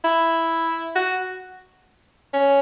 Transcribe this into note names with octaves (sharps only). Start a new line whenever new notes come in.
E4
F#4
C#4